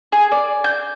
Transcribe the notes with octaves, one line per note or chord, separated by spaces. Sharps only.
G#4
D5
G6